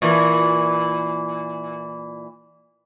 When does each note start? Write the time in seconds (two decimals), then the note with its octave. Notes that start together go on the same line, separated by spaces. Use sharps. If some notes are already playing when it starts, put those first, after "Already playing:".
0.02 A#2 E3